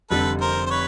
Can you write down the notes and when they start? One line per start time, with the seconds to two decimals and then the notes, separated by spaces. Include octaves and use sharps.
0.10 F1 F2 D3 G3 A4 B4
0.41 A#4 C5
0.66 C5
0.70 B4 C#5